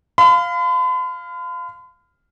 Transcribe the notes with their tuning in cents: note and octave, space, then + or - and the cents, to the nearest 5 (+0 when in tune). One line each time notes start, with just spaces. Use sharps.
F5 +0 B5 +45